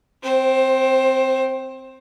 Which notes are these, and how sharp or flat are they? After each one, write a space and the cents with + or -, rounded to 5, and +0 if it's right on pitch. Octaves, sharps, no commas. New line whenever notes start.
C4 -10 C5 +20